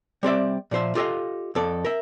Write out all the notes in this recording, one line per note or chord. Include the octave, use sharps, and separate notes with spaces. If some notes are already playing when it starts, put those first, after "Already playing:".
G3 C4 D5 E5
A#2 F3 C5 E5
F4 G4 A4 D5 D#5 F5
F2 A4 D5
A#4 E5